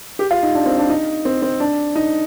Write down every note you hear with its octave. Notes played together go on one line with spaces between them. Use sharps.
G4
F4
D#4
D4
C4
D4
D#4
C4
C4
D4
D#4